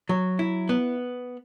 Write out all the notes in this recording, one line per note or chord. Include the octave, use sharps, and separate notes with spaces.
F#3
E4
B3